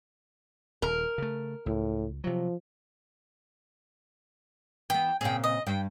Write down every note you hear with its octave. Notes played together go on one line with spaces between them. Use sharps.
D#1 A#4
C#3 A3
C#2 A2
C3 F3 F#3
E3 B3 G5
A#2 C#3 C4 G#4 G5
D#5
G2 G5